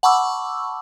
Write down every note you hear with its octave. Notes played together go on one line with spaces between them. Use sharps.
F#5 A5 B5 C#6 D6 E6